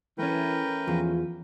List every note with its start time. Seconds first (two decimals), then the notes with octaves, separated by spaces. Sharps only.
0.18 E3 A3 C#4 A#4 B4 G5
0.88 E2 F3 F4